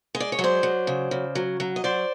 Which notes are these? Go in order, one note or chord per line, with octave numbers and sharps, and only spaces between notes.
G#3
D5
C#5
F#3
C5 D5
F#3
C#3
C#3
F#3
F#3
D#5
F#3 C5 D5